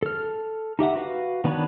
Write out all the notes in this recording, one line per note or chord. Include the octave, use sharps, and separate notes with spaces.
A4 F6
D#4 G4 E5 F#5
F#4 B4 F5
D#3 B3 D4 B4 C#5